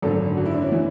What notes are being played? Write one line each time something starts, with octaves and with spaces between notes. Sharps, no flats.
G#1 F#2 D3 A4
F#4
E4
D4
C#4
E3